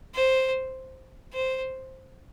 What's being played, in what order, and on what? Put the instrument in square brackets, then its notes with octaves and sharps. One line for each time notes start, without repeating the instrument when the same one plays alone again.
[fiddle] C5
C5